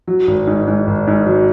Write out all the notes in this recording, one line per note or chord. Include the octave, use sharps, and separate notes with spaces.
F#3
G#1
G#2
G#2
G#1
G#2
F#3